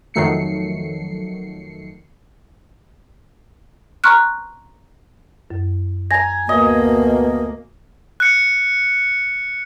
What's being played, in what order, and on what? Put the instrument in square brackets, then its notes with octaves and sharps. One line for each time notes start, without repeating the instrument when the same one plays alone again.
[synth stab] F2 D#3 F#3 A3 C7 C#7
[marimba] A#5 C6 C#6 F6 F#6
F#2
[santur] G#5 A#5 [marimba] A#6
[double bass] D2 A#3 [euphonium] B2 [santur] D#5
[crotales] F#6 C#7